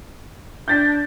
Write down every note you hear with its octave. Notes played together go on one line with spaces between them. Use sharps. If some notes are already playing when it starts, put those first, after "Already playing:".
D4 G6 A6 B6